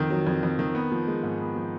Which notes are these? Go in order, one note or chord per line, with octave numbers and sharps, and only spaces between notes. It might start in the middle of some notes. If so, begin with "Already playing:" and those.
Already playing: F2 D#3
F#3
F2
F2
D#3
B3
F3
G#3
G#2
B3
F3